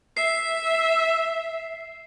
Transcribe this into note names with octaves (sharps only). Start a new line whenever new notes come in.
E5 C7